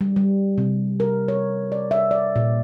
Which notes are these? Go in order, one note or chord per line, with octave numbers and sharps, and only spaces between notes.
G3
G3
C3
A#4
C#5
D5
E5
D5
A#2